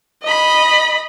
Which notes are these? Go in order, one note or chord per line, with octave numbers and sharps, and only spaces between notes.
D#5 B5